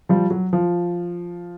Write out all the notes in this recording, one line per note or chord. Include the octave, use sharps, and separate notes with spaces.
F3 G3
F#3
F3